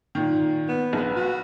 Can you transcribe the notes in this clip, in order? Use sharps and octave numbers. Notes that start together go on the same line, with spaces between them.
A#2 D#3
B3
A#1 B4
F#4